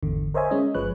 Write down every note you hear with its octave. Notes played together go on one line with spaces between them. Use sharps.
G#1 E2 D3
A#4 C5 C#5 D#5 E5 G#5
G#3 C#4 D#5
G1 F3 G#3 B4 C#5 F#6